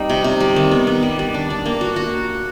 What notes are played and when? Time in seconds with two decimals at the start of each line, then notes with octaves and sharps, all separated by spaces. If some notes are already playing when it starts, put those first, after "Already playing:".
Already playing: G3 C4 D#4
0.10 C3
0.24 C3
0.40 G3
0.56 D#3
0.71 B3
0.87 B3
1.03 G3
1.19 G3
1.34 D4
1.50 D4
1.66 A#3
1.81 F#4
1.96 F#4